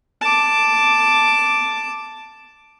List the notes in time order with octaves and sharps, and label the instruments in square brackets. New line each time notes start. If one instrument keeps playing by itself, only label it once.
[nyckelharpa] A5 D6